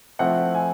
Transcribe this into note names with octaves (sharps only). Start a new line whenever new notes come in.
F3 A3 C4 E4 F#5
G#5